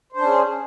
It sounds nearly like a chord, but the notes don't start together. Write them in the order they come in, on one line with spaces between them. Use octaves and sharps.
C5 D4 C#4 G#4